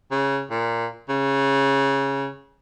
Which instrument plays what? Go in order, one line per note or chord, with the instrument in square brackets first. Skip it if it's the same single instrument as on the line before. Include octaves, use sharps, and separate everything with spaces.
[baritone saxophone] C#3
A#2
C#3